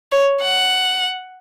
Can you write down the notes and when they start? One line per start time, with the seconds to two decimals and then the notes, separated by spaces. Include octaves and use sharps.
0.12 C#5
0.42 F#5